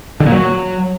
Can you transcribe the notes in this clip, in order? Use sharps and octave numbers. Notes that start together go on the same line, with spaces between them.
D3
A#2
F#3